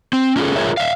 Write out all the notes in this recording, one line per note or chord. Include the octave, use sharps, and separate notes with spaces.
C4
C#4 D#4 F4 F#4 G#4 A4
F4 G#4 A#4 C#5 E5
E5 F5